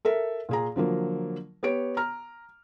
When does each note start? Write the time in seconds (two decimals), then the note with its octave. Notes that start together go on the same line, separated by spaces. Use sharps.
0.05 A4 A#4 E5
0.49 A#2 G#4 A#5
0.76 D3 F3 F#3 A#3
1.63 B3 G4 C#5 D7
1.97 A#5 F6